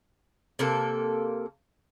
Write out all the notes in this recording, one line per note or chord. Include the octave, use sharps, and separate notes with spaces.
C3 A#3 A4